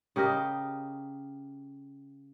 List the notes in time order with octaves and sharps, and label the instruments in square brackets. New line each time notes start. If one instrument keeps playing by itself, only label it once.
[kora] C#3 G4 A#4 D#5